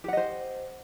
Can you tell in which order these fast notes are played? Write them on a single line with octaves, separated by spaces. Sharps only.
G4 F#5 D#5 C5